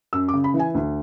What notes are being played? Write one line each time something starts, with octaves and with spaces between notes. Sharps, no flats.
F#2 E6
D6
C#3
B5
E3
G#5
D2